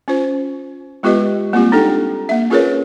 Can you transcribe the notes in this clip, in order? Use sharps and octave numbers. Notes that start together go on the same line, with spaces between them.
C#4 F4 C5
G#3 B3 F4 G4 B4 D#5
G3 A#3 C4 F4 G4
D4 D#4 A4 G5
A#3 E5
C#4 F4 G#4 A#4 B4 C#5